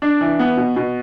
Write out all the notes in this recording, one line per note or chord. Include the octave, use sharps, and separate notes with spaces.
D4
E3
B3
B2
B2